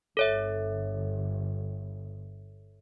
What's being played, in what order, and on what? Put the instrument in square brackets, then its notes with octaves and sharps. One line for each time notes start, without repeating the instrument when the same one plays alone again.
[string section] G1 [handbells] A4 C#5 E5